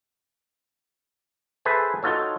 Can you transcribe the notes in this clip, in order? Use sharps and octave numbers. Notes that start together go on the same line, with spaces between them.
G#4 A4 B4 C5 E5 G#5
D#4 F4 F#4 A4 C#5